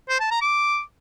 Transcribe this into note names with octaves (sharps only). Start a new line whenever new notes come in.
C5
A5
A#5
D6